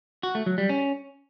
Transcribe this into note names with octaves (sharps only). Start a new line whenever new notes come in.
F#4
A3
F#3
G3
C#4